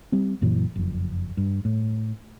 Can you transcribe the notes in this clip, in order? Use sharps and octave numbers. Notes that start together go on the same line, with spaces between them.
G3 C4
F#2 A#2 E3 F#3
F#1 F2
G2
A2